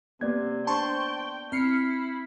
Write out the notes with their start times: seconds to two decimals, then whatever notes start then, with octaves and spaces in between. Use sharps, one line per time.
0.21 C3 A#3 B3 D5 G#6
0.67 D4 C5 G5 A5 C6 C#6
1.52 C4 E4 F6 C7 C#7